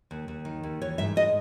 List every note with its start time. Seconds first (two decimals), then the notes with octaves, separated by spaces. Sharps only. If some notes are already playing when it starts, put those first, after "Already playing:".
0.11 D#2
0.28 D#2
0.45 D#3
0.63 D#2
0.81 E3 C#5
0.98 G#2 E5
1.16 G#2 D#5